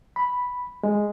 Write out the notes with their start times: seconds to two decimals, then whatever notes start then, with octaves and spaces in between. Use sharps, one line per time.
0.16 B5
0.83 G#3